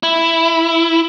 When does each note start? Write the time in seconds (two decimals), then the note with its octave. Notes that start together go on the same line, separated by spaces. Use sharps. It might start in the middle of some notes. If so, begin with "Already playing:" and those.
0.03 E4